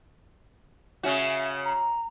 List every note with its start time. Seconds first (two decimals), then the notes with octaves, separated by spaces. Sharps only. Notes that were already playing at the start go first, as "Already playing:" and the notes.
1.03 C#3 C#4 F#4 E5
1.65 A#5